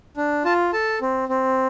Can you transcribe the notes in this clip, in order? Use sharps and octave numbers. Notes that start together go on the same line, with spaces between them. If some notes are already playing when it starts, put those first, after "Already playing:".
D4
F4 A5
A4 A5
C4
C4